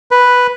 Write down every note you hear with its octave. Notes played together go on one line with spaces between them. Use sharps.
B4